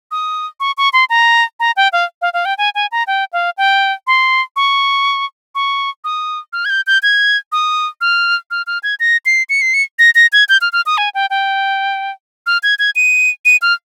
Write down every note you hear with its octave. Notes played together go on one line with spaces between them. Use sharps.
D#6
C#6
C#6
C6
A#5
A#5
G5
F5
F5
F5
G5
G#5
G#5
A#5
G5
F5
G5
C6
C#6
C#6
D#6
F6
G#6
G6
G6
G#6
D#6
F6
F6
F6
G#6
A#6
C7
C#7
C7
C#7
A#6
A#6
G#6
G6
F6
F6
D#6
G#5
G5
G5
F6
G#6
G#6
D#7
D#7
F6